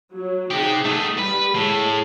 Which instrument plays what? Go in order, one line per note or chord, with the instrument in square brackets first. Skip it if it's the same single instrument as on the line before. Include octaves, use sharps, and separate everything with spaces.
[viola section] F#3
[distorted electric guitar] C4 G4 [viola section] D#4 G#4 F#5
[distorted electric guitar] A3 G#4 [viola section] D#4
[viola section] G3 [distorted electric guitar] B4
[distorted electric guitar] A2 [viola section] G#3